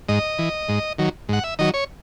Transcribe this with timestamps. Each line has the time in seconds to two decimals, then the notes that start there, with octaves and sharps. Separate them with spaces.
0.08 G#2 D#5
0.39 E3
0.68 G#2
0.99 D#3 F#3
1.29 G#2 F#5
1.44 E5
1.59 D#3 F#3 D#5
1.74 C#5